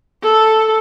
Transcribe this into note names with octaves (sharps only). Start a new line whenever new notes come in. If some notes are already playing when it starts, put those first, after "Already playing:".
A4